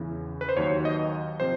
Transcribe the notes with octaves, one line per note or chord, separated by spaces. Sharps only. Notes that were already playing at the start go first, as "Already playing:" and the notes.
Already playing: E2 C#3 E3
B4
C5
D#2 D#3 F#3 C#5
D#5
C3 F3 C5